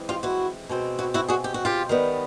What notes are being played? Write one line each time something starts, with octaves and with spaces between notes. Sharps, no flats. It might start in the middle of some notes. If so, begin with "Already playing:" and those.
Already playing: E3 G#3 C4
F4 G4
E4 F#4
B2 G#3 C4
E4 F#4
E4 F#4
F#4 G#4
G4
F#4
F4 G4
D#3 G3 B3